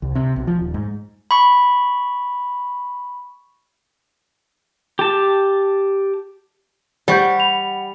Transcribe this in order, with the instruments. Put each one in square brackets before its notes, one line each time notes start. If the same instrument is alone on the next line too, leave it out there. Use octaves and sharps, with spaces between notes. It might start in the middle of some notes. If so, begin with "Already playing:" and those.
[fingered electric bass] C2
C3
B1
F3
D#1
G#2
[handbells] B5 C#6
[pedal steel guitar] G4 A5
[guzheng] G3 [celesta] C5 C#6 G6 [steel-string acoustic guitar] F#5
[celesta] B5 F7